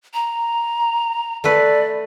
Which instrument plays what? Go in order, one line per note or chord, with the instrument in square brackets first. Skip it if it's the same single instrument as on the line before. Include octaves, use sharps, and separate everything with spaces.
[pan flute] A#5
[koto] A3 A4 B4 [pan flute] D5